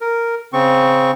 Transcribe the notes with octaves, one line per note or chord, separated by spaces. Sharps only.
A#4
C#3 C4 C#6